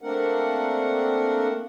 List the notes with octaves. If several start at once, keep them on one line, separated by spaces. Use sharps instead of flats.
A3 A#3 C4 D4 A#4 F#5